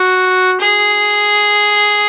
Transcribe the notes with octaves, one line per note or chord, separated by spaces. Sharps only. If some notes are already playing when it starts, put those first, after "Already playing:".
Already playing: F#4
G#4